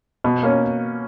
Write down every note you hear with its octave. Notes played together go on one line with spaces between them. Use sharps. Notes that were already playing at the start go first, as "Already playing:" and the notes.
B2
A#3 C#4